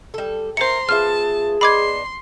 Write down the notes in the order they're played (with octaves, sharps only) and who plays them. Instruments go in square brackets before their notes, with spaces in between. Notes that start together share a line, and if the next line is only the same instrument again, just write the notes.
[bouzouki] G3 A4
[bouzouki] E4 G#4 A#4 [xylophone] C5 C#7 [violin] A#5 C6
[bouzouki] B3 F4 E5 [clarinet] G#4 [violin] A5 [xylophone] F6
[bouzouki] B3 D4 D#4 [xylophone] B5 D6 G#6 [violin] C6